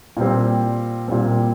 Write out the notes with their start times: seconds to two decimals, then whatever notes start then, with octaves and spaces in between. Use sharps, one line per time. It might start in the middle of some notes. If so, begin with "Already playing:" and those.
0.17 A#2 G3 C4
1.08 A#2 G3 C4